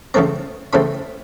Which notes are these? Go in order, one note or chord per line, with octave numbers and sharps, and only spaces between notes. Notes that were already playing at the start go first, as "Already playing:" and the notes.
C#3 E3 A3 C4 A#5
C#3 E3 A3 C4 B5